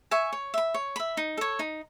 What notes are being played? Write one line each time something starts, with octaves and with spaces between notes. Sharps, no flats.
E5 G#5 C#6
C#5
E5 B5
C#5
E5 B5
D#4
A4 C#5
D#4